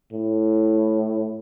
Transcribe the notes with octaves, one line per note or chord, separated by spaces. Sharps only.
A2